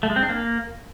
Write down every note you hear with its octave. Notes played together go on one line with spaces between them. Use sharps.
A3
G#3
C4
D4
A#3